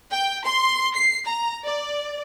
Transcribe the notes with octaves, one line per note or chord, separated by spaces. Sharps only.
G5
C6
C7
A#5
D5